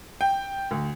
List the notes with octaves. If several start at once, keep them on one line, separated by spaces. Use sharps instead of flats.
G5
D2